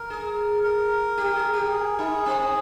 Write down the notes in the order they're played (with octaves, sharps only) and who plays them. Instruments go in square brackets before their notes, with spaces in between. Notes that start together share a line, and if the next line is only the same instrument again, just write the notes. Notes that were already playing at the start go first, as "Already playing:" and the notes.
Already playing: [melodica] A#4
[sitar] G#4
[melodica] A#4
[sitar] G4
G#4
G4
[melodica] G#4
[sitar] D#4
C4